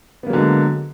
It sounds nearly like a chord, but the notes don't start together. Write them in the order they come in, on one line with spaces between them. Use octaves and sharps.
B3 A#3 F#3 D3 G#3